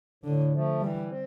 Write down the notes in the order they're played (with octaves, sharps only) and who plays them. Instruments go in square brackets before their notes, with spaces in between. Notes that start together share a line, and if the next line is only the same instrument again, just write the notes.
[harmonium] A2 [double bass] D3
[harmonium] F3 A3
[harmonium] E3 [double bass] G3
[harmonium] C4